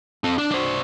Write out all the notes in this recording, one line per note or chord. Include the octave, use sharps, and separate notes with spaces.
C4 A4
D4
D4 C5